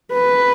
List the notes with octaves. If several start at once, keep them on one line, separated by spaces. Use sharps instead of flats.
B4